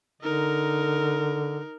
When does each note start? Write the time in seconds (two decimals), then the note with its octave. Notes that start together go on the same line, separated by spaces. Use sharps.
0.21 D3 D#4 A#4